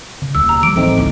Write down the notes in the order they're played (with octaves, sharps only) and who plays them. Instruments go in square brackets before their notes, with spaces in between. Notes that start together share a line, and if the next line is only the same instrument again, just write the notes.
[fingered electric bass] C#3
[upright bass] D#2 B2 [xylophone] E6
[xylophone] A#5
[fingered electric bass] E3 F3 G3 [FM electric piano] D6 [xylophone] D7
[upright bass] A1 [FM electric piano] A3 C4 D#4
[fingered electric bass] A1 [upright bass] D2 A2